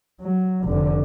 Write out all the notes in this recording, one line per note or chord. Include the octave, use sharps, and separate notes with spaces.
F#3
F1 D3